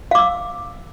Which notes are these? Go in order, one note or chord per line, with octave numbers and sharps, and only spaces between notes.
F5 D6 E6